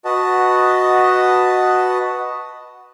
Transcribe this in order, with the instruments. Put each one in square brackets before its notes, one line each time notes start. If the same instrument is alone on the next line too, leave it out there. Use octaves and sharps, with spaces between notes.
[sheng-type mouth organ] F#4 B4 D#5 F#5 A5